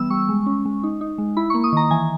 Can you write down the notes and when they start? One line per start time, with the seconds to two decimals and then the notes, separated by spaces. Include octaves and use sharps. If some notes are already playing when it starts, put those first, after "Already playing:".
Already playing: E3 G3 B3 E6
0.10 G3 C#6
0.29 G#3
0.46 C#4
0.65 G#3
0.83 D#4
1.01 D#4
1.18 G#3
1.37 E4 B5
1.50 C#6
1.54 A#3
1.64 D#6
1.72 D#3 A#5
1.91 E3 G#5